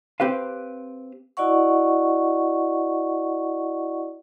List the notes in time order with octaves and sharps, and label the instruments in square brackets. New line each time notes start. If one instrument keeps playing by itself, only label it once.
[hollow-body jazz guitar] C4 G4 B4 F5
[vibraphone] E4 F#4 D5 D#5 F#5 C#6